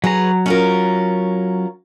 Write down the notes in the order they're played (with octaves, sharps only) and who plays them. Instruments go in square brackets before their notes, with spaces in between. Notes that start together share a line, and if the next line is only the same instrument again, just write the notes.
[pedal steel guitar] F#3 A#5 [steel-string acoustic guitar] G#4 B4
[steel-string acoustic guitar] C#4 F4 A#4